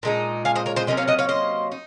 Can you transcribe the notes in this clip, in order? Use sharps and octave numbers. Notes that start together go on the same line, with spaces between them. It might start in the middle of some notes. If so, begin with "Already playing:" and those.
A#2 G#3 C4 D#4
F5 G#5
C5 D#5
A#4 C#5
C5 D#5
C3 F#3 A#3 C#4 D#5
C#5 F5
D#5 F#5
C#5 F5
C5 D#5
D#4